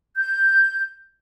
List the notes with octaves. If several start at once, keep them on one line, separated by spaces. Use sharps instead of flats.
G6